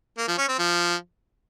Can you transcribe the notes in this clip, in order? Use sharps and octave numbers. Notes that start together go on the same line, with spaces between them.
A#3
F3
C#4
C4
F3